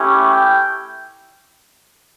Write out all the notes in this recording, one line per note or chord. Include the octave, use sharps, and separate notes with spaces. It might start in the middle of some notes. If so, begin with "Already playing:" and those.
Already playing: A3 C#4 E4 G4
G5